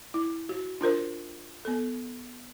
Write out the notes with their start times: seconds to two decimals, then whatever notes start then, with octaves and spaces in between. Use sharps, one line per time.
0.14 E4
0.49 F#4
0.81 D4 F4 A#4 C5
1.65 B3 A4